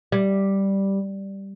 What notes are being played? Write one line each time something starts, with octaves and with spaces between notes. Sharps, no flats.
G3